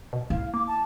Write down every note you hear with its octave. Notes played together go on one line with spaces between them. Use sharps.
B2
E4 F5
A#3 D6
A5